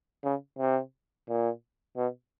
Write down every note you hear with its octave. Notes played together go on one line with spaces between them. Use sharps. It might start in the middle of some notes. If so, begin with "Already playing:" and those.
C#3
C3
A#2
B2